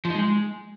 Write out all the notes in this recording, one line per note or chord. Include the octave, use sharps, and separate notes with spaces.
F3
D#4
G#3